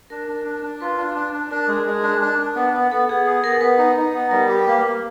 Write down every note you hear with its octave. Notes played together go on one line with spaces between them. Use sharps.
D4 A#4
D4
D4
D4
F4 B4
D4
D4
D4
D4 A#4
G#3
G#3
D4
D4
D4
B3
B3
B3 A4
B3 G#4
G#4
B3 A#4
B3 B4
D#4
D#4
B3
G3 A#4
G4
A#3 B4
A#3